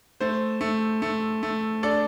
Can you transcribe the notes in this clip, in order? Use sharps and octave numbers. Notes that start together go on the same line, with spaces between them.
A3 C5
A3
A3
A3
D4 A4 D5